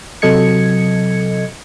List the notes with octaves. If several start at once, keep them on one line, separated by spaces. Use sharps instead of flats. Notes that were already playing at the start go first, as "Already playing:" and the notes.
C3 F#3 A4 D#5 G#6 C#7